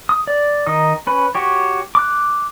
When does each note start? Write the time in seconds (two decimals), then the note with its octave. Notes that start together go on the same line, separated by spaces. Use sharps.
0.09 D#6
0.27 D5
0.67 D#3 D#4 D#6
1.07 C#4 B4
1.35 F#4 G4 C#5
1.95 D6 F#6